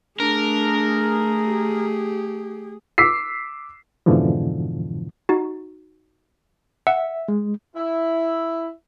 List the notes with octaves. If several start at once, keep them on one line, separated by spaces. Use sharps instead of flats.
A3 D4 G#4 A#4
G4
D6 E6 B6 C7
F2 G#2 B2 D3 E3 F3
D#4 F#4
E5 F#5
G#3
E4